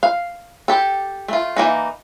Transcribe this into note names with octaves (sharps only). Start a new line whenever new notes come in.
F5
G4 A4
A3 F4
E3 G3 A#3 D#4